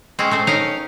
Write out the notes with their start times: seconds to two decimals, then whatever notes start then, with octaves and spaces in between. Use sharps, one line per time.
0.19 G#3 C4 C#4
0.31 A3 C4 C5
0.47 C#4 D#4 A#4 F5